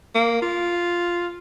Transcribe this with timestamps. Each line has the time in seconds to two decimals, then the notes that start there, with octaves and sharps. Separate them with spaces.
0.15 A#3
0.42 F4